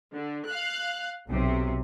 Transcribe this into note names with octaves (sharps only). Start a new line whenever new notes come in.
D3
F5 F#6
B1 C3